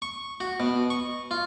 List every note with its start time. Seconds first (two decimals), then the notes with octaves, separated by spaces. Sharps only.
0.02 C#6
0.40 F#4
0.60 B2
0.90 C#6
1.31 F4